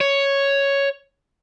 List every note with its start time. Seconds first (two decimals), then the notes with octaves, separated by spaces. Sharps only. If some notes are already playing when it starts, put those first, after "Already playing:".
0.01 C#5